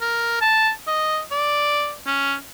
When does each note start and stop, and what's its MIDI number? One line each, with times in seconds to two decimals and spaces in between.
0.01 0.39 70
0.41 0.71 81
0.87 1.20 75
1.31 1.93 74
2.06 2.35 61